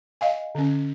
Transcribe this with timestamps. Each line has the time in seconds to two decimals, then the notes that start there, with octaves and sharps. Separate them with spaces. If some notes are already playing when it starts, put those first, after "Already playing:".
0.21 D#5 F5 G#5
0.55 D3 C#4